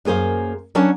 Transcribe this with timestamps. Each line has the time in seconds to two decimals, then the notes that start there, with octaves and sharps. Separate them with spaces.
0.05 F#2 A#3 G#4 C5 F5
0.75 F#3 C#4 D4 C#5 F#5 A5